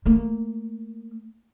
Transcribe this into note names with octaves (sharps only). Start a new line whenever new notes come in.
A3 A#3